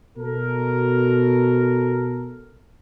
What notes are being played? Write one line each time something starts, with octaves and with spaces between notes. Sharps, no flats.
B2 A4 A#4